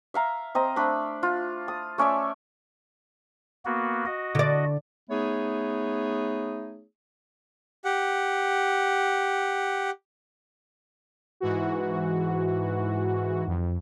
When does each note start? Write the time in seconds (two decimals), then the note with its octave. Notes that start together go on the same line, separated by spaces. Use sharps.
0.14 E5 F5 A#5
0.55 C4 D#5 A#5
0.76 A3 D4 B5
1.23 F4
1.68 D#6
1.98 A3 C#4 D5 E5
3.65 A#3 B3 F#4
4.06 F#4 D#5
4.35 D3 D5
5.10 A3 B3 D#4 G#4 C#5
7.85 G4 F#5
11.40 G#2 E3 F#4
13.47 F2